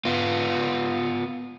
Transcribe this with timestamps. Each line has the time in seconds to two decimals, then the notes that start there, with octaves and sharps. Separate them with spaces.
0.05 B3 F4